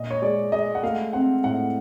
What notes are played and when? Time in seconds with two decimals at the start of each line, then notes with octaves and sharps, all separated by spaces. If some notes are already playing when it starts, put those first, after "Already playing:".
Already playing: A#2 D#5
0.11 C#5
0.22 G#3 D5
0.52 G#3 D#5
0.75 F#5
0.83 A3 F5
1.13 C4 F#5
1.44 A2 F#5